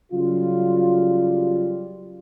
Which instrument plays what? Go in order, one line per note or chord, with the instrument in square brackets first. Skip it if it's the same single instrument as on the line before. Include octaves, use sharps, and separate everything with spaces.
[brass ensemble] C#3 F#3 G3 F4